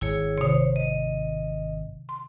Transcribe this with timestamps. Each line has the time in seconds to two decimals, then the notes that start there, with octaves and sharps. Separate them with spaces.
0.01 G#1 E4 G#4 C#5
0.38 C3 D#3 C5 C#5
0.76 D#5
2.09 C6